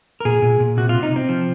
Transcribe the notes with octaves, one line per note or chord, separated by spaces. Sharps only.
A#4
A#2 G#4
A#2
A#2
C3 F#4
F4
C3
D#4
C3 C4
F3